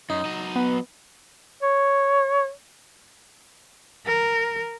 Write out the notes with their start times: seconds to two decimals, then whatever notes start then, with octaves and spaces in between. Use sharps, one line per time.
0.10 F#2 D#4
0.25 F#3 D#5
0.56 B3
1.63 C#5
4.06 A#4